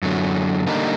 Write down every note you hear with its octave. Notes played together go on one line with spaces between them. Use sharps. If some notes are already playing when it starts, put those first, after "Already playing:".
F#2 D3 F#3
D3 G3 A#3 D#4